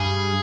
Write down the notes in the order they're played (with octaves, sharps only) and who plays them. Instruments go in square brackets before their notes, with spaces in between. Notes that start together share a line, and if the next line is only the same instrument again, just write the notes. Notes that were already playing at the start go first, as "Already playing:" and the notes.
Already playing: [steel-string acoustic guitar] G2 G3 [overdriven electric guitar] G#4